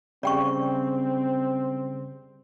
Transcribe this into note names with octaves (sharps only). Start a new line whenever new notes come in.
C#3 G3 C4 D5 G5 C#6